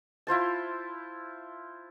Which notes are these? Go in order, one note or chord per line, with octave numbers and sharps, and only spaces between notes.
E4 F4 C5 A5